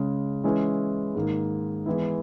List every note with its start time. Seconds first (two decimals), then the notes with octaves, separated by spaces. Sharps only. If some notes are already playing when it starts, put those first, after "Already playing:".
Already playing: C#3 G#3 C#4
0.44 E3 G#3 C#4 E4 B4
1.15 G#2 D#3 A#3
1.86 E3 G#3 B3 E4